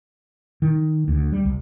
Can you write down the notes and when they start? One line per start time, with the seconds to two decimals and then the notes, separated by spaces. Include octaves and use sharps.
0.62 D#3
1.08 D2
1.32 G3
1.45 C2